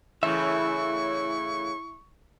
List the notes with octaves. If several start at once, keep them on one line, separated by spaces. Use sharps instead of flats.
A2 C#3 E3 E4 E5 C#6